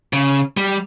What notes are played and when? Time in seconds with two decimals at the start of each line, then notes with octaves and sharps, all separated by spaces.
0.13 C#3
0.57 G3